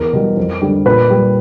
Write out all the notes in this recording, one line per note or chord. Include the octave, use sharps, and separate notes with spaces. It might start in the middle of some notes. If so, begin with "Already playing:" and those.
Already playing: E2 A#4
B2 G3
F2
D3 G3
A#2 B4
G3